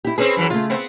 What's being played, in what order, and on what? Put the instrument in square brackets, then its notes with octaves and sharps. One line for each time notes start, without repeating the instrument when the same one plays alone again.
[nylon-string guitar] E4 G4
[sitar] C4 C#4 G#4 [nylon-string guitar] B4 C5
[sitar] F#2 E3
[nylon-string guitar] C#3 A3 [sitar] F4
[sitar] B3 C4